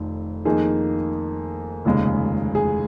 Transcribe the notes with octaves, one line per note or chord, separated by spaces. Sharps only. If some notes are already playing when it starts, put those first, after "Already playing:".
Already playing: F1 F2 D#3
F2 D#3 A#3 D#4 G#4
F1 D#2 C#3 G#3
G#4